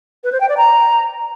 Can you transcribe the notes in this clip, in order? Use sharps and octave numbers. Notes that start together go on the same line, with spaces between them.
B4
C5
G5
D5
A#5